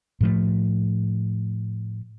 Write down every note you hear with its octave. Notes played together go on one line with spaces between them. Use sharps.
A2 F3 A3